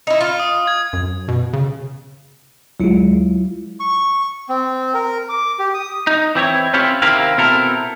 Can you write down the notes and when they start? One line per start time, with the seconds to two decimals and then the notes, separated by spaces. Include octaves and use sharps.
0.07 D#4 E4
0.21 F4
0.40 D#6
0.67 G#6
0.93 F#2
1.28 B2
1.53 C#3
2.80 D2 F#3 G#3 E4 F4
3.80 C#6
4.49 C4
4.94 A#4
5.29 D6
5.59 G4
5.74 D#6
6.07 D#4
6.35 E3 C4 E4 C#5
6.74 C4 C#4 E4 F4 G4 C#5
7.02 D#2 C3 A#3 C4 E4 F5
7.37 B2 C4 E4 A4 A#4